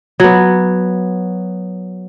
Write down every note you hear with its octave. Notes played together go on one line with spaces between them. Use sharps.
F#3 B3